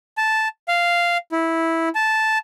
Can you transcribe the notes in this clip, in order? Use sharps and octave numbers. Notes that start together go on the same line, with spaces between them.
A5
F5
E4
A5